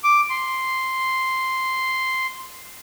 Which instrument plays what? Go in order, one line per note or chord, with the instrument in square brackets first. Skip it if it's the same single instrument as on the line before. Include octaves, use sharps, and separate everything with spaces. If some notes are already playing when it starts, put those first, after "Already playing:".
[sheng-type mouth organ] D6
C6